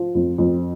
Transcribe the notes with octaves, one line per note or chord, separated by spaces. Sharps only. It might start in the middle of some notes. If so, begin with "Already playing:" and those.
Already playing: F3
F2
F2